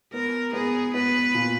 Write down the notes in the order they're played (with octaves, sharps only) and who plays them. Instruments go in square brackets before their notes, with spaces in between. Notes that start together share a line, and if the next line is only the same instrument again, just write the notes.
[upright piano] B3 [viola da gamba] A#4
[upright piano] B3 [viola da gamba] G#4
[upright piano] B3 [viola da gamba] B4
[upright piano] A#2